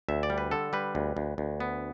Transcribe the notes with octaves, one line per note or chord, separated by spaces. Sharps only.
D2 E5
D5
G3
B4
D3 A4
G3 B4
D2
D2
D2
B3